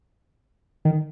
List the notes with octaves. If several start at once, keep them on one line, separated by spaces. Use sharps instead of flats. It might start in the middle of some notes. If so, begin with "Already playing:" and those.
D#3